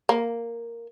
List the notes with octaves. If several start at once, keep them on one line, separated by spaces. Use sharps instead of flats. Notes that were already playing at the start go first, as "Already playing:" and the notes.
A#3